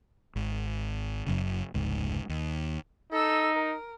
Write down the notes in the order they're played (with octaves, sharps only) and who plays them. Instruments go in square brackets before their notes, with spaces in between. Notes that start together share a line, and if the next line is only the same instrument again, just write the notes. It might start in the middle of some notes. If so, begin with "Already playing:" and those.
[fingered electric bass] G#1
F#1 F#2 C#3
F1 C#2 G#2
D#2
[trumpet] D#4 [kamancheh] A4 E6
[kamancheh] A#4